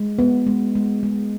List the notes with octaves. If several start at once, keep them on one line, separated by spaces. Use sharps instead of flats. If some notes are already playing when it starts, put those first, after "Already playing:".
Already playing: G#3
B3
G#3
G#3
G#3